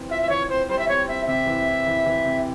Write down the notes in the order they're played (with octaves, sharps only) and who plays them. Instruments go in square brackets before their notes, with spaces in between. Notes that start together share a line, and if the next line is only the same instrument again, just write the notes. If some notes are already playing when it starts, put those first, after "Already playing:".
Already playing: [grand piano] E3 C4
[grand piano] F4 [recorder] E5
[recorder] E5
[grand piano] E3 [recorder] C#5
[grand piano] C4 [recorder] C5
[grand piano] G3 [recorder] C5
[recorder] E5
[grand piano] C4 [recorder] C#5
[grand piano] C4 [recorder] E5
[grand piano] C3 [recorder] E5
[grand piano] E3
E4
E3
E3
C3